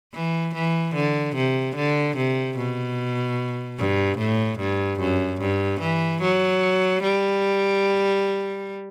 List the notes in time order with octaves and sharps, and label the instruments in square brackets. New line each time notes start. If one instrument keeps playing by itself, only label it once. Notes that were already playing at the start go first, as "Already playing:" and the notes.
[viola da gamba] E3
E3
D3
C3
D3
C3
B2
G2
A2
G2
F#2
G2
E3
F#3
G3